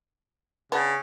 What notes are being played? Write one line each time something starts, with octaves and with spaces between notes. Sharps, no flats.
C#3 B3 D4